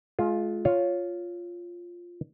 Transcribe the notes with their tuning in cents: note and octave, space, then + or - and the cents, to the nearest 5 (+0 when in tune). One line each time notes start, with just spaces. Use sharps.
G#3 +35 F4 +0
F4 +0 C#5 +0